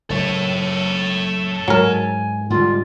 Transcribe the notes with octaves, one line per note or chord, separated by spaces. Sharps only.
F#1 A4 C#5
G#2 F#3 A#4 G#5
G#2 D3 G3 F4